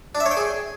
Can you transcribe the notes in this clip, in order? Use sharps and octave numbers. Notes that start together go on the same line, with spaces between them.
D4
E5
C#5
G5
G#4